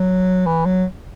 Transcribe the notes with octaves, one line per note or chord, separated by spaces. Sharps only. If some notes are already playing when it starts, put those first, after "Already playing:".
Already playing: F#3
E3
F#3